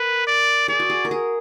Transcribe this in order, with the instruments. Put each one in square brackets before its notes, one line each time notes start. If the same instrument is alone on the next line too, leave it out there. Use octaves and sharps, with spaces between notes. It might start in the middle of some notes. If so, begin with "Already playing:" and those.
Already playing: [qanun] A#4 [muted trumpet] B4
[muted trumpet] D5
[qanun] G#4 [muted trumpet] D5
[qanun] F#4
G#4
A#4
G#4